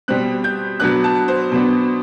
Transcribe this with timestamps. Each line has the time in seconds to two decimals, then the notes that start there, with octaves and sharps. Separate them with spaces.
0.08 B2 G3 C4 F#6
0.44 G6
0.80 B2 F#3 B3 D4 F#6
1.04 A5
1.28 C5
1.52 B2 F#3 B3 D4